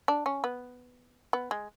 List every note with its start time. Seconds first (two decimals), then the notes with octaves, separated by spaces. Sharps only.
0.08 D4
0.26 C#4
0.44 B3
1.33 B3
1.51 G#3